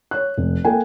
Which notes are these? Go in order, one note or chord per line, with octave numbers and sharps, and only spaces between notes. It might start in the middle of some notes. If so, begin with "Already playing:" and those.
C#5 F#6
F1
A#3 A4 G5 G#5